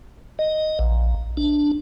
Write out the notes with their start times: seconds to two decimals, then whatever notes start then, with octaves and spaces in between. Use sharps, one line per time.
0.39 D#5
0.79 A#1
1.37 D4